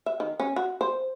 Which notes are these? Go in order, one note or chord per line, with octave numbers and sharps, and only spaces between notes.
E5
D#3
C#4
F#4
C5